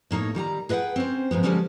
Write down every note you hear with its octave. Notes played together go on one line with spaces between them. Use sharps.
A2 A#3 D#4 C#5
D#3 G3 G5 A#5
G#4 B4 D#5 E5 F#5 G5
C4 C#4 C5
G#2 F3 G#3 B3
D3 F3 G3 G#3 C#4 D4